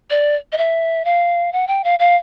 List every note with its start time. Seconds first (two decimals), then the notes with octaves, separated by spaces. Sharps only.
0.10 D5
0.52 D#5
0.58 E5
1.05 F5
1.52 F#5
1.67 G5
1.84 F5
1.99 F5